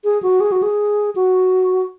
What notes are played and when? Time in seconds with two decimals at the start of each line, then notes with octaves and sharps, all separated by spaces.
0.04 G#4
0.23 F#4
0.40 G#4
0.52 F#4
0.63 G#4
1.15 F#4